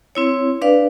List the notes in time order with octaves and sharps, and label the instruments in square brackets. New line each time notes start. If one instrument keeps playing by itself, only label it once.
[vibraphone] C4 E4 C#5
D4 B4 D5 F5